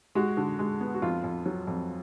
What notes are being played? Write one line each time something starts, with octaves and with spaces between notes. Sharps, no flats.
G#3 F#4
D3
G#3
B3
F#4
F2 F4
F2
F#3
F2